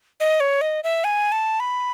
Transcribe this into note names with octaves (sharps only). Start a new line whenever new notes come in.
D#5
C#5
D#5
E5
G#5
A5
B5